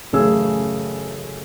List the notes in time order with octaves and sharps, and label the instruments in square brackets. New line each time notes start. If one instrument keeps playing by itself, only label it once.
[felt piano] A1 F#2 C#3 A3 G#4 E6